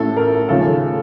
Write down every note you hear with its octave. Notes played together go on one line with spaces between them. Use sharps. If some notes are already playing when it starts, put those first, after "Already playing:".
Already playing: A1 A2 A3 A4
A#4
D#2 C#3 F3 A3 A4